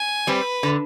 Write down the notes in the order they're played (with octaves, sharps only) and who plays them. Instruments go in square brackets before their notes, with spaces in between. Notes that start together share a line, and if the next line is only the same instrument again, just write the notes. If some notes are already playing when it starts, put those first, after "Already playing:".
Already playing: [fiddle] G#5
[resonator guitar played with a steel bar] G3 C4 [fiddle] B4
[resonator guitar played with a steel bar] D3